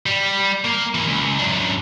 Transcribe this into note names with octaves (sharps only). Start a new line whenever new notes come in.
G3
A#3 F5
E3 A#3
C#2
F#2 D4